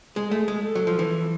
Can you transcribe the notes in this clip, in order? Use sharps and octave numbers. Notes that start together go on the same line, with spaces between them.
G#3 G#4
A3
G#3
A4
F#3
F3
E3